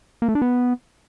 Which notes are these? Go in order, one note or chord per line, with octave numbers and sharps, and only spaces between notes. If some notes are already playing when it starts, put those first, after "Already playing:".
A#3
A3
D4
B3